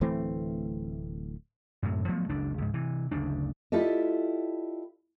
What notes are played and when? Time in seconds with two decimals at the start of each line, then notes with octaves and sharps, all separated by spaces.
0.01 D1 E3 A3 C4
1.83 F#2 A2 C3
2.08 F3 F#3 A3 B3
2.29 F#1 C#2 D4
2.58 C#2 G#2
2.74 C3 E3
3.11 F#1 D2 C#3 D4
3.72 E4 F4 G4 A4 D5 D#5